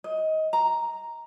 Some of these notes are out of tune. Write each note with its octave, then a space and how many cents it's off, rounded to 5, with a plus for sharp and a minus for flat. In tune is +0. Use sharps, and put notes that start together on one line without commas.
D#5 +20
A#5 +0